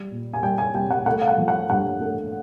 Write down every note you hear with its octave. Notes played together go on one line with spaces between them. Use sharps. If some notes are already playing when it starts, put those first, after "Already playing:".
Already playing: G3
A#2
G#5
G3 G5
G#5
C2 G5
F#5
A3 F#5
F5
F#5
F3
F#5
G2 F#5
A3